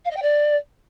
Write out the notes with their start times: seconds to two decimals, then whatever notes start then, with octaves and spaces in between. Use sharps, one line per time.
0.04 F5
0.10 D#5
0.16 G5
0.22 D5